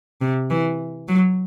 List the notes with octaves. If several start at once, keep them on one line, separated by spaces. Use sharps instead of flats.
C3
E3
F#3